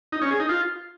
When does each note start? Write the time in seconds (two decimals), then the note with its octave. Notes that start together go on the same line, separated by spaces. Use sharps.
0.12 D#4
0.22 C#4
0.31 G#4
0.40 D#4
0.49 F4